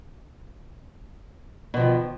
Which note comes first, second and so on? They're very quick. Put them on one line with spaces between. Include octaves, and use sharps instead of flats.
B2 F3 D#3